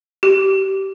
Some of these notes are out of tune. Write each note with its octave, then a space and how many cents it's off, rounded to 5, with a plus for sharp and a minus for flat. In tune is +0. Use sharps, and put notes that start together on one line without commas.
G4 -20